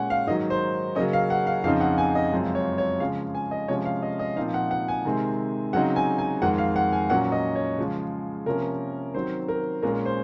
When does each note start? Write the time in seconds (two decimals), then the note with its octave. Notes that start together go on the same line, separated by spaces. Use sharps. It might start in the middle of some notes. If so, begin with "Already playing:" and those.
Already playing: A#2 G#3 C#4 F#5 G#5
0.10 F5
0.27 G#2 D#3 F#3 D#5
0.50 C5
0.95 C#3 F#3 A#3 C#4 D#5
1.13 F5
1.30 F#5
1.47 F5
1.64 F2 C#3 F3 C4 D#4 F5
1.81 F#5
1.98 G#5
2.15 D#5
2.32 F#2 C#3 F3 G#3 C4
2.55 C#5
2.78 C#5
3.00 C#3 F3 G#3 F5
3.35 G#5
3.51 D#5
3.68 C3 F3 G#3 C#4 C#5
3.85 F5
4.02 D#5
4.19 D#5
4.36 A#2 F3 C4 D#4 F5
4.54 F#5
4.71 F#5
4.88 G#5
5.05 C3 D#3 G#3 C4
5.73 C#3 F#3 C4 D#4 F#5
5.96 G#5
6.18 G#5
6.42 F2 D#3 G#3 F#5
6.58 F5
6.76 F#5
6.93 G#5
7.10 A#2 F#3 C#4 F#5
7.32 D#5
7.55 C#5
7.78 C#3 F3 G#3
8.46 C3 F3 A#3 C#4 A#4
9.14 D#3 F#3 C4 C5
9.48 A#4
9.82 A#2 G#3 C#4 A#4
10.06 C5